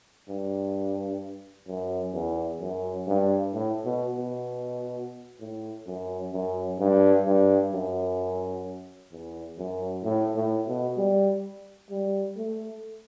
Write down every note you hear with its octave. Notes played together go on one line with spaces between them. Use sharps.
G2
F#2
E2
F#2
G2
A2
B2
B2
A2
F#2
F#2
G2
G2
F#2
E2
F#2
A2
A2
B2
G3
G3
A3